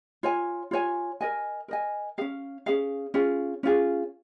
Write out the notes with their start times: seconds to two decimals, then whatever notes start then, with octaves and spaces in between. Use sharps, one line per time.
0.23 F4 C#5 G#5
0.71 F4 C#5 G#5
1.21 A#4 D#5 G#5
1.68 A#4 D#5 G#5
2.18 G#4 F5
2.21 C#4
2.66 C#4 G#4 F5
3.14 C#4 F4 G#4
3.63 C#4 F4 G#4